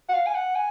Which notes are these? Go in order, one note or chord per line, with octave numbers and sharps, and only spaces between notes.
F#5
F5
G#5
F#5
G#5